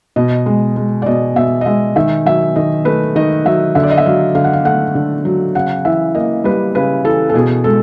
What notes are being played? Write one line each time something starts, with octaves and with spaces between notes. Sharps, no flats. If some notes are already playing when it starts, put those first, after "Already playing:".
B2 D#5
G#3
G#3
D5
B2 D#5
B2 E5
D#5
G#3 E5
D#3 E5
F#3 E5
D#3 D#5
A3 B4
D#3 D#5
F#3 E5
D3 E5
D5
D#5
E5
F#3 F5
D3 F5
F#5
F5
A3 F#5
D3
F#3
C#3 F#5
E3 E5
A#3 D#5
G3 B4
C#3 B4
E3 A4
A4
B2 G#4
G#3 A4